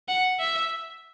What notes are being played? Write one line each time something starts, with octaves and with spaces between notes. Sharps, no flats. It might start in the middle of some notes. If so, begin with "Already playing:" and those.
F#5
E5